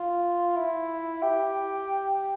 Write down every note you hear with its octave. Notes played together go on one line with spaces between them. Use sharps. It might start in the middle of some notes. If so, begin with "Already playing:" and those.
Already playing: F4
E4
G4